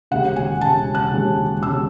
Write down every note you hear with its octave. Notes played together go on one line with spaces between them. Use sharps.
E1 D#2 C#3 F#5
G#5
E1 D#2 C#3 A5
F#6
E1 D#2 C#3
E1 C#3 E6